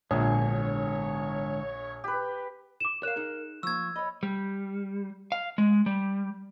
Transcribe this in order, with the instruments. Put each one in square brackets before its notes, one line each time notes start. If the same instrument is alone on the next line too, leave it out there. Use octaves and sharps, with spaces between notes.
[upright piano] A#1 [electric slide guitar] G#2 D3 [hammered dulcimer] G#4 [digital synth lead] C#5
[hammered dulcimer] G4 B4
[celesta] D6 E7
[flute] A#4 [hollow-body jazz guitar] C#5 F5 [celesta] F#6 E7
[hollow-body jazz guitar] D#4 G#4
[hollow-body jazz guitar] F3 A#3 [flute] C#6 [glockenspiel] E6 G#6
[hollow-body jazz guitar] C#5 D#5 [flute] B5
[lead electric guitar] G3
F5
G#3
G3